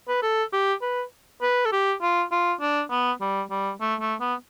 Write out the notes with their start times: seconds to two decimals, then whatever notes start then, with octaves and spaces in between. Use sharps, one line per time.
0.08 B4
0.23 A4
0.53 G4
0.82 B4
1.42 B4
1.65 A4
1.72 G4
2.02 F4
2.32 F4
2.61 D4
2.91 B3
3.21 G3
3.51 G3
3.81 A3
4.01 A3
4.20 B3